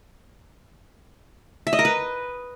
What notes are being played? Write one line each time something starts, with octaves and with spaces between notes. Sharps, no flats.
E5
D#5
A#4
B4